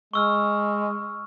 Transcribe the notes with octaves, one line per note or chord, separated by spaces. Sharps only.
G#3 C#6 E6 F6